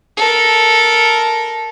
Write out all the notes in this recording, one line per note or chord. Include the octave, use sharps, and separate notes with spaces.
A4 A#4